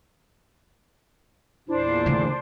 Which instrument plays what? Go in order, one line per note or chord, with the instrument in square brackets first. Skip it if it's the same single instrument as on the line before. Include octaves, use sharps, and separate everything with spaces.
[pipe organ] E2 A#2 [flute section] D4 C5 [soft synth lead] E4
[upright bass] D3 A3